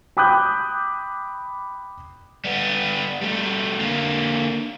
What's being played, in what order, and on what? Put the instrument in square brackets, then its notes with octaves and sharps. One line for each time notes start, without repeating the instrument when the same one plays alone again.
[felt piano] G5 B5 D6 D#6 F#6 G6
[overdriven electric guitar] G3 B3
G3 A3
D3 A#3